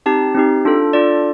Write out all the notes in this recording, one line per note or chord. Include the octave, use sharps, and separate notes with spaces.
C4 D#4 G4 A5
C4 D#4 G4
D4 F4 A4
D4 F4 A4 D5